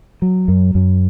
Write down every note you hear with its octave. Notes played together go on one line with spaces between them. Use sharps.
F#3
F#2
F#2